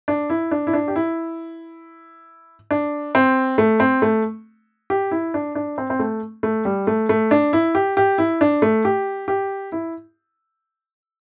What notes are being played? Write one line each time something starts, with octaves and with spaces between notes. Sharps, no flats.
D4
E4
D4
E4
D4
G4
E4
D4
C4
A3
C4
A3
G4
E4
D4
D4
C4
C4
A3
A3
G3
A3
A3
D4
E4
G4
G4
E4
D4
A3
G4
G4
E4